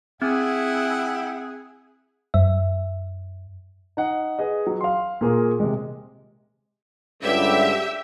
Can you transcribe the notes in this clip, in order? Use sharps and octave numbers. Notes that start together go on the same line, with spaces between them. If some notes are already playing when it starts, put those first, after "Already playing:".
C4 E4 G#4 E5 F#5 G5
F#2 E5
D#4 F#5
G#4 B4 D#5
F#3
F5 C6
A#2 A#3 G#4 A#4
C3 G#3
C#2 G2 D3 G4 E5